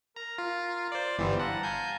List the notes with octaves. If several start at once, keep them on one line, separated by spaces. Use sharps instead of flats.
A#4 A#5
F4
C5 D5
G1 E3 G3 B3 E4 C5
F5 F#5 A5 A#5
G#5 G6